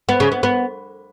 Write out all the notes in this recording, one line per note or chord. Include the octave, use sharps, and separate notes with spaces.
B3
C#3
B3
B3